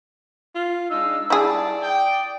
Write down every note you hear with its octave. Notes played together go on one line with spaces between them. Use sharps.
F4
G#3 D4 D#4 F5 E6 F6
G3 E4 G#4 D5 A5
G5 D#6